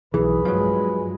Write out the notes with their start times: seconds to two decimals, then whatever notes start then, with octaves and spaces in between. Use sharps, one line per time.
0.14 B1 E3 G#4 B4
0.45 G2 F3 F#3 G#3